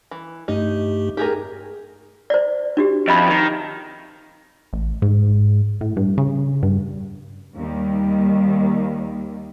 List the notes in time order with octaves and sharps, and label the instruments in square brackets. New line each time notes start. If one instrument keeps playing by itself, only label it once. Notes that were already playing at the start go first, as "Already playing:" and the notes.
[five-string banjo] E3
[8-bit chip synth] G2 A3 G4 [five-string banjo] D#4
[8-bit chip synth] D#4 [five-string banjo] G4 G#4 A#4
[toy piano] C5 D5
D4 F#4 G4
[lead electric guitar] F2 [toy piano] D#5 E5 B5
[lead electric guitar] D#3
[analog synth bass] A1
G#2
A2
G2
C#3
G2
[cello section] D#2 D#3 G3